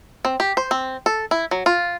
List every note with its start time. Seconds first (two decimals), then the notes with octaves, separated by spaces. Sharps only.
0.25 C4
0.40 G4
0.57 C5
0.71 C4
1.06 A4
1.31 E4
1.51 F#3
1.66 F4